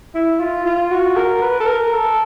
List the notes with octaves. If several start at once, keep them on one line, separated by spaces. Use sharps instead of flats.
E4
F4
F4
F#4
A#4
B4
A4
A#4
A4